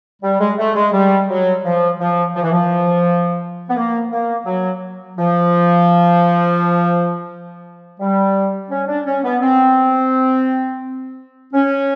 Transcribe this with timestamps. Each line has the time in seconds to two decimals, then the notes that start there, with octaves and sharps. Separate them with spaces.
0.22 G3
0.40 G#3
0.58 A3
0.75 G#3
0.93 G3
1.29 F#3
1.64 F3
1.99 F3
2.35 F3
2.43 E3
2.52 F3
3.69 B3
3.76 A#3
4.12 A#3
4.46 F#3
5.18 F3
8.00 G3
8.70 C#4
8.88 D4
9.06 C#4
9.23 B3
9.42 C4
11.53 C#4